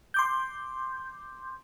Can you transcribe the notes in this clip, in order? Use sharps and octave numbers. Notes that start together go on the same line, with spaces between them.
C6 D6 G6